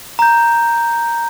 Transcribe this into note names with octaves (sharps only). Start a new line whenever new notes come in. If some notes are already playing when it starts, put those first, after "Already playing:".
A#5 G6